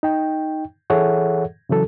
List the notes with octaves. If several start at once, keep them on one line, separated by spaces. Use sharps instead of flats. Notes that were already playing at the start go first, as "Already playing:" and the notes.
D#4 G5
E3 G#4 A4 C#5 E5 F#5
C#3 E3 F#3 A4